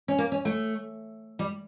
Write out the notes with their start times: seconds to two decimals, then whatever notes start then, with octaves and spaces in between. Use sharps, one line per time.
0.08 C#4
0.18 A#3
0.32 C#4
0.45 A3
1.39 G3